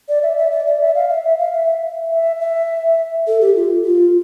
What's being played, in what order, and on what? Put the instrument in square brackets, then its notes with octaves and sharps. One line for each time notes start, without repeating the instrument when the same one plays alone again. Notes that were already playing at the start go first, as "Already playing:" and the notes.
[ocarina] D5
E5
E5
D5
D5
E5
F5
E5
E5
F5
E5
E5
E5
A4
G4
F4
F4